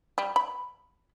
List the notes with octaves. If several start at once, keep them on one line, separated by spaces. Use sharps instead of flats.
G3
B5